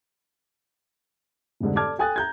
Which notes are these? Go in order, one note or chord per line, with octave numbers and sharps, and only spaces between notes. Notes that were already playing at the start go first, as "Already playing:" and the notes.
F1 C2 G#2 D3
A4 D5 A5 D6 F6 G#6
A4 G5 G#5 D#6 F#6 A6
A#5 G6 G#6